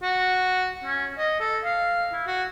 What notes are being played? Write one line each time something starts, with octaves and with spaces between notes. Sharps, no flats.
F#4
C#4
D#5
A4
F5
E4
F#4